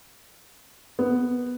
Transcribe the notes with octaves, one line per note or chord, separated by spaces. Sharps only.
B3